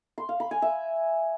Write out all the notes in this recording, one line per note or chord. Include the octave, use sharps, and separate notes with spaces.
C6
F5
B5
G#5
E5